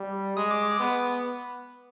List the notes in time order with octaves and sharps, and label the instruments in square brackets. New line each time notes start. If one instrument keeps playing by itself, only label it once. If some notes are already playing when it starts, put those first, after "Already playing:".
Already playing: [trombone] G3
[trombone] G#3 [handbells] D#6
[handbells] D6
D6
[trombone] B3